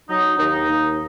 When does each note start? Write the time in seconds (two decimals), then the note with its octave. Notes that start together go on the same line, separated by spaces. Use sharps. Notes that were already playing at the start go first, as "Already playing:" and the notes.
0.10 F#3 D#4
0.38 D#2 D#4
0.68 D#2